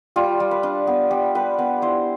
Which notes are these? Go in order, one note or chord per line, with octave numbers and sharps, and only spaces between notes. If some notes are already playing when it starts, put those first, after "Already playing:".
G3 F4
G3
B4
D4
B3
G3 G4
G3 B4
B3 B4
E4 C5